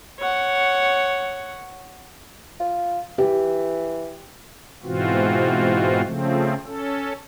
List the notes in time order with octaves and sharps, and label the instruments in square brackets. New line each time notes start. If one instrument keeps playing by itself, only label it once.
[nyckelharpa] C#5 F#5
[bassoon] F4
[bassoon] E3 [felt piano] G4
[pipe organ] G#2 B2 E3 C4 F4 F#4
C#3 F3 A3 C4
C#4 A4